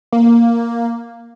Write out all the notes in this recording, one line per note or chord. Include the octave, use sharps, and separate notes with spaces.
A#3